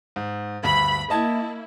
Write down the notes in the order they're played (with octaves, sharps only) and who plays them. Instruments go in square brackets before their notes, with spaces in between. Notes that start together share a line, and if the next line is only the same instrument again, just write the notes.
[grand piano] G#2
[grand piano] D2 G2 [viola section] B5
[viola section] A#3 E4 [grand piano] D#5 A5 G#6